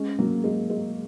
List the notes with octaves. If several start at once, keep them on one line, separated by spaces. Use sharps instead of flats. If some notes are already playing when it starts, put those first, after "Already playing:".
Already playing: G#3 C#4
F#3 A#3
G#3
G#3